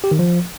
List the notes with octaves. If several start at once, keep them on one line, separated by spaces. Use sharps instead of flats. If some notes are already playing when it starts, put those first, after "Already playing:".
G4
D#3
F3